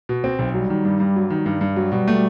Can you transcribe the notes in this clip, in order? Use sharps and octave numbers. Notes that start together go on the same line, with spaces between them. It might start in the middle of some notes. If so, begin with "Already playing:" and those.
B2
C4
B1
F#3 G3
D#3
G2
G2
F#3
D#3
G2
G2
F#3 G3
B2
A3